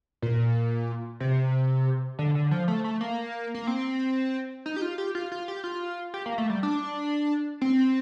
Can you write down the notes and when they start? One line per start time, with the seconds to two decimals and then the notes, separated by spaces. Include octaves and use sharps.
0.22 A#2
1.20 C3
2.19 D3
2.35 D3
2.51 F3
2.68 A3
2.84 A3
3.01 A#3
3.54 A#3
3.67 C4
4.66 D#4
4.76 G4
4.82 F4
4.98 G4
5.15 F4
5.32 F4
5.48 G4
5.64 F4
6.14 G4
6.26 A#3
6.38 A3
6.50 G3
6.63 D4
7.61 C4